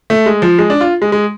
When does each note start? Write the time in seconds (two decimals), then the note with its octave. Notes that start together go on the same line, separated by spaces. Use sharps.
0.10 A3
0.26 G#3
0.42 F3
0.59 G#3
0.70 D4
0.81 F4
1.02 G#3
1.12 G#3